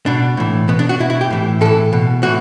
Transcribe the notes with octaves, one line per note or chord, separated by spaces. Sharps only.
B2 D4
A2 E3
B2 B3
D4
F#4
B2 E4
E4
G4
A2 E3
A2 E3 A4
B2
A2 E3 F#4